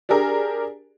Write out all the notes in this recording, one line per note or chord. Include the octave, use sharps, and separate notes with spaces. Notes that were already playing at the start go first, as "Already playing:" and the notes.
D4 G4 G#4 A#4